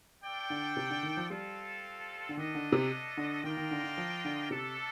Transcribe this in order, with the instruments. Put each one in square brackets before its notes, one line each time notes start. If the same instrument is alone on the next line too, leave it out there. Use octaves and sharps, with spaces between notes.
[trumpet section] D4 A4 D5 G5
[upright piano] D3
C3
D3
D#3
F3
[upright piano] G3 [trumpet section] C4 F4 A4
[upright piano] D3
[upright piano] D#3 [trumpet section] A3 D4 A4 D#5
[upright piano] D3
C3
D3
[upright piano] D#3 [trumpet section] D4 F4 A#4 D#5 G5
[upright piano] D#3
D3
D3
F3
D3
[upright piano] C3 [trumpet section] A3 D4 A4